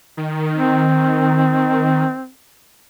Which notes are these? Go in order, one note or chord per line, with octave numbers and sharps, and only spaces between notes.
D#3
C4